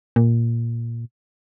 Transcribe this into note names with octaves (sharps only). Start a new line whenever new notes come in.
A#2